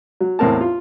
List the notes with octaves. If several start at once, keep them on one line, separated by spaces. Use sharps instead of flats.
F#3
E2 A2 C4 A#4 A5
F4